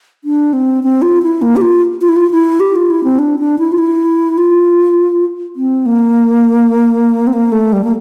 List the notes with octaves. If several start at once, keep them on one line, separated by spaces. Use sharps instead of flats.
D4
C4
C4
F4
E4
A#3
G4
F4
F4
E4
F4
E4
G4
F4
E4
C4
D4
D4
E4
F4
E4
F4
C4
A#3
C4
A#3
A3
G3
A#3